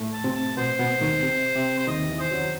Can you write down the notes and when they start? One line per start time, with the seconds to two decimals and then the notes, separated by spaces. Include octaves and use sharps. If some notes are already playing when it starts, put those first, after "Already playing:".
Already playing: A2 A3
0.14 A5
0.24 C3 C4
0.35 A5
0.57 B2 B3 C5
0.79 B2 B3
1.01 D#2 D#3
1.22 C3
1.55 C3
1.79 C5
1.88 D#2 D#3 D#5
2.09 E2 E3
2.20 C5
2.31 F#2 F#3